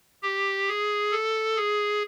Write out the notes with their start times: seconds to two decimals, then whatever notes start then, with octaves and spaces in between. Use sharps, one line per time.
0.23 G4
0.68 G#4
1.12 A4
1.56 G#4